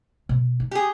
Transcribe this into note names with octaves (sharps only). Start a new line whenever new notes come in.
B2
D#4
G4 G#4